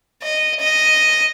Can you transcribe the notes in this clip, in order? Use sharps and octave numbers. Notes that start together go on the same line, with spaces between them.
D#5
D#5